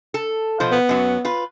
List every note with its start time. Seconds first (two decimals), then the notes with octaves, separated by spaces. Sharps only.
0.14 A4
0.60 B2 F3 C5
0.72 B3
0.89 F#2 F#3
1.25 F4 B4